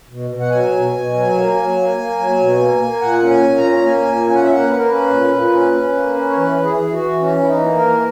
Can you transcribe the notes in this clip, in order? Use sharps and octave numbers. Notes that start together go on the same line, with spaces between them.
B2
B2
F#5
F#3 G#5
B2
B2
F#3
A#3
F#3
A#3
A#3
F#3
B2
A#3
A#3
A#2 F#5
C#4
G#5
A#2
A#5
C#4
A#5
A#3 G#5
A#2
C#4 G#5
F#5
E5
A#3 F#5
A#3 B4
A#4
C#4 B4
A#2
A#2
C#4
C#4
A#3
C#4
C#5
E3 B4
E3
G#4
E3
F#4
E3
C#4
E3 E4
D#4
A#3
A#4
E3